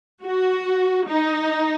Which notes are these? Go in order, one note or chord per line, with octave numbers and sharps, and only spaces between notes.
F#4
D#4